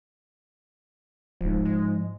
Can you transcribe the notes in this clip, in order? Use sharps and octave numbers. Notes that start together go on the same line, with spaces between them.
D1 G#2 F3
G#3